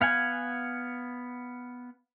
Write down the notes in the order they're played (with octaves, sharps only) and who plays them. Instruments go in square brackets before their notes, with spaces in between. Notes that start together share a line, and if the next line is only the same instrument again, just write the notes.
[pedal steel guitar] B3 F5 F#5 G#5